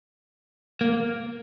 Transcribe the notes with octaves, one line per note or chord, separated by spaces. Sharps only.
A#3